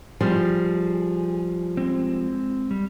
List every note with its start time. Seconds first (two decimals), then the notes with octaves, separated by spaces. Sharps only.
0.21 F3 G3 G#4
1.77 G#3 C4
2.71 G3